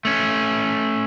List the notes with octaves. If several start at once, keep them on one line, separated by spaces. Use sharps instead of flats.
A3 C#4